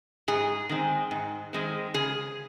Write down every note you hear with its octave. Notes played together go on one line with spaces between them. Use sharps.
G#2 G#4
D#3 G#3 C4
G#2
D#3 G#3 C4
C#3 G#4